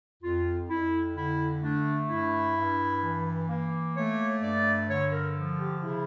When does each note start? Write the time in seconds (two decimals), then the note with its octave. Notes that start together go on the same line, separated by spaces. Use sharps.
0.23 F2 F4
0.69 F2 E4
1.16 D3 E4
1.63 A3 D4
2.09 G2 E4
2.56 G2
3.02 E3
3.48 A#3
3.95 A3 C#5
4.41 G2 D5
4.88 D3 C#5
5.12 A#4
5.35 F3
5.58 G4
5.82 C#3 E4